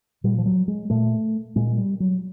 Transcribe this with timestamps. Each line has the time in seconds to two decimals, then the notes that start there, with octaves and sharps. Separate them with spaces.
0.24 A#2 G3
0.38 F3
0.46 F#3
0.68 G#3
0.90 A#2 A3
1.56 A#2 G#3
1.78 G3
2.00 F#3